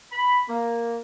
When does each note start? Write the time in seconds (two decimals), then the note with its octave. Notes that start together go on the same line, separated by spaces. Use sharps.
0.12 B5
0.49 A#3